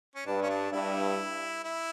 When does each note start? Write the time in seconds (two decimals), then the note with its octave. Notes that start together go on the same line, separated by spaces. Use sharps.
0.16 C#4
0.27 G2 D4
0.42 C#4
0.50 D4
0.72 G2 E4
1.64 E4